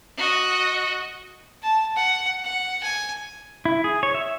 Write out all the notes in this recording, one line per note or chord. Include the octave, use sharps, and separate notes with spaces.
F#4 D#5
A5
F#5
F#5
G#5
E4
G#4
C#5
E5